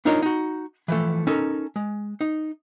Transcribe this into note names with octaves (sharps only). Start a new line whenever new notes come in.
D4 D#4 F4 A#4 C#5 D#5
D#4 F#4
E3 F3 A3
C#4 D#4 A4 A#4
G#3
D#4